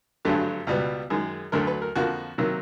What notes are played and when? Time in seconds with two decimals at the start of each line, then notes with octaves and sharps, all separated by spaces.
0.25 G#1 G2 D3 F#3 A3 G4
0.67 C#2 B2 G3 B3
1.10 F#2 D#3 G#3 G#4
1.52 D2 D3 F#3 A3 A#4
1.67 B4
1.82 A#4
1.95 F2 D3 F3 A#3 F#4
2.38 C3 D#3 F#3 A#3